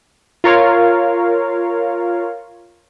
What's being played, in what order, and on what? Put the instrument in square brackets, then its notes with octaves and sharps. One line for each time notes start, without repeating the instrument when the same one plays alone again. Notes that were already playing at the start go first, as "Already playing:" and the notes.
[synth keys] F4 A#4 C#5 F5